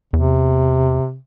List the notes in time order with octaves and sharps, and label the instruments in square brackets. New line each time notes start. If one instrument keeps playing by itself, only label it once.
[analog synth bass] E2 [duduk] C3